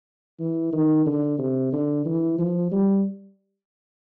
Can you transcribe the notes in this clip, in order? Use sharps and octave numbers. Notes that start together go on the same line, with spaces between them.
E3
D#3
D3
C3
D3
E3
F3
G3